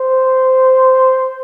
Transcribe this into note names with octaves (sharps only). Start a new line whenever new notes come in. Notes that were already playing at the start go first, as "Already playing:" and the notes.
Already playing: C5